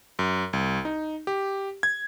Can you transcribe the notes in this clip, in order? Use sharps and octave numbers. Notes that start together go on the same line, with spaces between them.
F#2
C2
D#4
G4
G#6